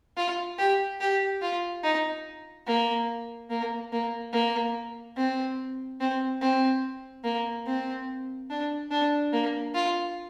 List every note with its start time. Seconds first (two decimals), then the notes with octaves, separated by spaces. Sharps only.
0.17 F4
0.59 G4
1.01 G4
1.42 F4
1.84 D#4
2.67 A#3
3.50 A#3
3.92 A#3
4.33 A#3
5.17 C4
6.00 C4
6.42 C4
7.25 A#3
7.67 C4
8.50 D4
8.91 D4
9.33 A#3
9.75 F4